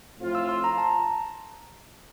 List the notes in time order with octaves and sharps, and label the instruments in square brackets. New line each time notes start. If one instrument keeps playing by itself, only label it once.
[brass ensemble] A2 F3 C4 F4
[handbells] E6
C6
A#5
A5